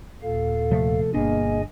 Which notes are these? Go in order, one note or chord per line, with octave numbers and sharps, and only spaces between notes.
D#2 A#2 A4 F5
C3 F3 A3
G1 B2 A#3 D4 G#4 D#5 G#5